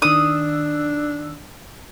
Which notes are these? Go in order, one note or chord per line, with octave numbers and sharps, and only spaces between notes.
D#3 D4 D#6 E6